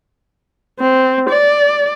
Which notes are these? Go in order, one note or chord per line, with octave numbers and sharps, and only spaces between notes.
C4
D5